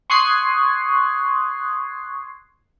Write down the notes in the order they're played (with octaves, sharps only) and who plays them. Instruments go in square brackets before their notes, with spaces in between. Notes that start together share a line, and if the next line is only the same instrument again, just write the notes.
[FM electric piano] C6 C#6 D#6 F#6 G#6 C7